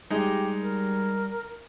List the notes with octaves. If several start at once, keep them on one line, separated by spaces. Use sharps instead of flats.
G3 G#3 D#4 G4
A#4